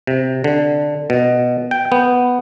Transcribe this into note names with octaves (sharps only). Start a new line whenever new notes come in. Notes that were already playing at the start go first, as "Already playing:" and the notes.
C3
D3
B2
G5
B3